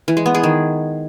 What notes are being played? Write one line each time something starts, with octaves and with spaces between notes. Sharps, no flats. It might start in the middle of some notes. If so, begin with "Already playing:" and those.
E3
G#3
B3
G#4
D#3